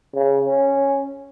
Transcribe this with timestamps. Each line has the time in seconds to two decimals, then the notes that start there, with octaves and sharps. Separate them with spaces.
0.15 C#3
0.45 C#4